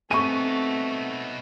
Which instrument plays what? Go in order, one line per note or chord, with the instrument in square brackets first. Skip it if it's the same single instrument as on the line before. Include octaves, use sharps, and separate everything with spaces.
[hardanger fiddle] A3 [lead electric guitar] B3 D#4 [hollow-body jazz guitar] C4 E5 G#5 [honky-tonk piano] C#6 D#7